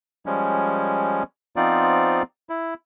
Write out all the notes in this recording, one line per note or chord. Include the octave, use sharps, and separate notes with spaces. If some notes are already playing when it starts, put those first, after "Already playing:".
F3 G3 G#3 C#4
F3 B3 C4 D#4 F4 D5
E4